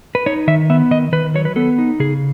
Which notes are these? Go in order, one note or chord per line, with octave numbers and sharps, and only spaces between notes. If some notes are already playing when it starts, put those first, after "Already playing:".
B4
D#4 C#5
D#3 E5
B3 E5
D#3 D#5
D#3 B4
F#3 C#5
B4
B3 A4
D#4
C#3 G#4